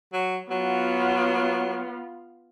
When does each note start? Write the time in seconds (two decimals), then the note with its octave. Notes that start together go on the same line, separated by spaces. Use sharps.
0.13 F#3
0.51 F#3 B3 F4